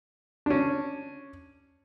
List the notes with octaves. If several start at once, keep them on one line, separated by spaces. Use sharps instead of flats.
C#4 D4